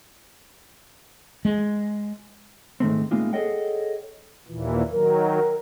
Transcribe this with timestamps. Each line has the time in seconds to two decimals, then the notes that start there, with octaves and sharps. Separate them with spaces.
1.45 G#3
2.80 G#2 D#3 A3 C4
3.11 A2 G#3 A#3 C4 D#4 F4
3.33 G#4 A4 C#5 D#5 F#5 G5
4.48 D#2 A#2 E3
4.91 D#3 F#3 A#4